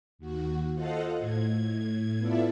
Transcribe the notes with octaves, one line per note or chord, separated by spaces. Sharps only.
D#2 F#4
F4 A4 C5 D#5 F5 F#5
A2 G#6
B3 E4 F4 A4 D5 E5